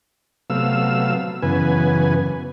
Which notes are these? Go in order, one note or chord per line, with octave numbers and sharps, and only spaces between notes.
C3 F#3 A3 B3 F5 E6
F#2 C#3 E3 B3 B4 G#5